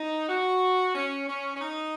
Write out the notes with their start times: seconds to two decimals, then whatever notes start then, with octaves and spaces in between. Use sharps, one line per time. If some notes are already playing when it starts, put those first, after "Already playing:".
Already playing: D#4
0.28 F#4
0.95 C#4
1.28 C#4
1.55 C#4
1.61 D#4